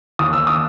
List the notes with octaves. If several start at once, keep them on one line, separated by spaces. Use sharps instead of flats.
D#2 D#6
E6
D#6